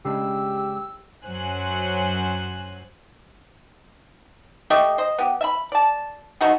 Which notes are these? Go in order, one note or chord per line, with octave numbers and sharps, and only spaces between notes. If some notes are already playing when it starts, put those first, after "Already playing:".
C#3 G#3 D4 G4 E6
F#2 F#3 C5 G#5 F#6
A3 G4 D#5 C#6
C5 D#5
B3 G4
E5 B5
D5 A5
A3 D#4 F#4 G#4